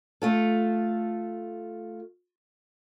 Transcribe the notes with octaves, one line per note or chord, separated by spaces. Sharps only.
A3 F4 A4